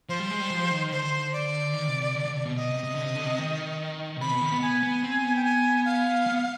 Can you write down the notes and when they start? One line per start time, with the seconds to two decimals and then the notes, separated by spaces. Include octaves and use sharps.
0.09 F3 C5
0.19 G3
0.30 G#3
0.40 G3
0.50 F3
0.71 D#3
0.92 D3 C5
1.33 D5
1.74 D#3
1.88 C3
2.01 C3
2.15 D3
2.25 D3
2.36 C3
2.46 B2
2.56 B2 D#5
2.70 C3
2.83 C3
2.94 D3
3.05 C3
3.15 D3
3.26 C3
3.39 D#3
4.17 B2
4.21 C3 B5
4.31 B2
4.42 D#3
4.52 B3
4.62 B3 G#5
4.83 B3
5.03 C4
5.24 B3
5.36 G5
5.44 G#5
5.85 F5
6.27 B3